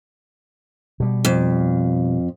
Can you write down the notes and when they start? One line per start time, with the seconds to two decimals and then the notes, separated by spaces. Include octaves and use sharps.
1.00 B2 G3
1.25 F2